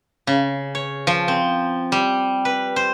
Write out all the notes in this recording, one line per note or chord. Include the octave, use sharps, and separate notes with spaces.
C#3
C#5
F3
C4
G3
B4
C5